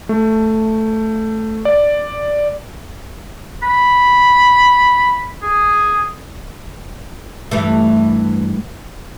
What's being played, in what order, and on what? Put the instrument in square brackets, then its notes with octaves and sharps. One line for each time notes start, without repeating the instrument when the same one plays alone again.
[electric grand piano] A3
D5
[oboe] B5
G#4
[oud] G2 E3 A3